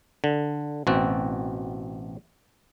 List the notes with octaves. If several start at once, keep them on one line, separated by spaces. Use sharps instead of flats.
D3
A1 B2 C4 F#4